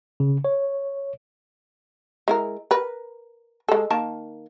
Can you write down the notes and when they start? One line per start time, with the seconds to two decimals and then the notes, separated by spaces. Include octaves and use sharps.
0.20 C#3
0.45 C#5
2.28 G#3 E4 A#4
2.71 A#4 B4
3.69 G#3 A4
3.90 D#3 A#3 A5